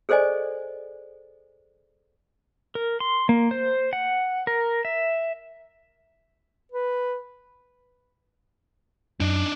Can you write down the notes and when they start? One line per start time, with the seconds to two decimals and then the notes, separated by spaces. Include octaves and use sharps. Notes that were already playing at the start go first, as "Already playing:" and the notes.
0.09 G#4 A4 C5 D5 D#5 G#5
2.75 A#4
3.00 C6
3.29 A#3
3.51 C5
3.93 F#5
4.47 A#4
4.85 E5
6.72 B4
9.20 F#2 D4 D#4